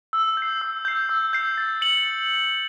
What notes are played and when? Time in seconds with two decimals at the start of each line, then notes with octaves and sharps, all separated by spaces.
0.13 E6
0.37 G6 C7
0.61 E6
0.85 G6 C7
1.09 E6
1.33 G6 C7
1.58 A6
1.81 C#7 F#7